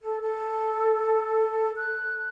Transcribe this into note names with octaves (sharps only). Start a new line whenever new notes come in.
A4
A4
F#6